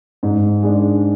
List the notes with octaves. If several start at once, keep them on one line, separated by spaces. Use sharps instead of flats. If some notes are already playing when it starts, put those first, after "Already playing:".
G#2
G#3 D4